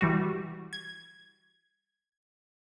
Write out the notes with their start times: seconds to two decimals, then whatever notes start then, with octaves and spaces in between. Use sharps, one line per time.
0.01 E3 G3 F#4
0.73 G#6